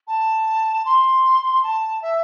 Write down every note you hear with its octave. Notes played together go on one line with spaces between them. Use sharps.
A5
C6
A5
E5